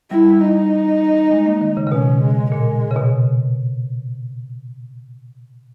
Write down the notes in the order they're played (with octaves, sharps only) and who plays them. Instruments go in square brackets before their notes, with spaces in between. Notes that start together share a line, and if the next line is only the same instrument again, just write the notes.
[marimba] G3 [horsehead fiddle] E4
[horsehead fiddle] D#4
[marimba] G#3
A#3
D#3
C#3
C#3
[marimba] B2 [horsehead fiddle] C#4
[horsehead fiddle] G#3
[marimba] A#2 [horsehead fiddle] G#3
[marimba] C#3
B2